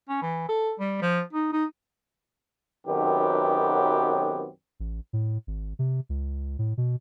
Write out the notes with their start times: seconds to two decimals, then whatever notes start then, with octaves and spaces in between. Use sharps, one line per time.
0.09 C#4
0.22 E3
0.49 A4
0.79 G3
1.02 F3
1.33 D#4
1.53 D#4
2.87 B1 F#2 D#3 B3 C4 G4
4.80 A1
5.13 A2
5.47 G#1
5.79 C3
6.09 C#2
6.59 A2
6.78 B2